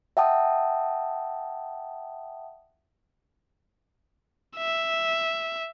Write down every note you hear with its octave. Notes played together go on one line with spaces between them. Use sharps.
E5 F#5 G5 A5 D#6
E5